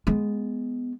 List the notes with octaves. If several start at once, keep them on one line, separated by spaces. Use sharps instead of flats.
G#3 B3